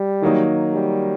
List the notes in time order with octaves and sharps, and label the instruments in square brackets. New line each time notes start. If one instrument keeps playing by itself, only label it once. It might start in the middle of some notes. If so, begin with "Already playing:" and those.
Already playing: [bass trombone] G3
[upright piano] D#3 F#3 A#3 D#4
[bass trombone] G3